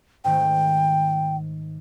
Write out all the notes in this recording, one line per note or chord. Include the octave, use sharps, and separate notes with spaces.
G#2 D#3 A3 G5